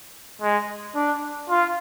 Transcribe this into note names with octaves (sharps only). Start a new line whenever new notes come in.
G#3
D4
F4